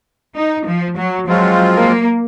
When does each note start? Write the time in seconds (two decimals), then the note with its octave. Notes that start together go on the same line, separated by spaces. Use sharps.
0.36 D#4
0.66 F3
0.97 F#3
1.28 F3 F#3 G#3 C4 F4
1.74 A#3